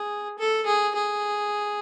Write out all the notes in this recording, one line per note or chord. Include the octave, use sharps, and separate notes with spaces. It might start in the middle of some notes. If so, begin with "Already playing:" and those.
Already playing: G#4
A4
G#4
G#4